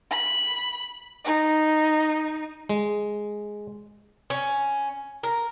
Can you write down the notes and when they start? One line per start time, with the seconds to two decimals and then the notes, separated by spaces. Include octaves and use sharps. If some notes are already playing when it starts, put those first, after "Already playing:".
0.10 B5
1.24 D#4
2.69 G#3
4.30 C#4
5.23 A#4